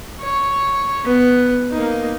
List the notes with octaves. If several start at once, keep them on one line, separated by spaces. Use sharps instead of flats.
C#5
B3
A#3 D#4